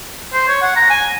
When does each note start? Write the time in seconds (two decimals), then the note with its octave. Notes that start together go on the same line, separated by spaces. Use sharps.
0.33 C5
0.48 C#5
0.62 F#5
0.76 A#5
0.90 G#5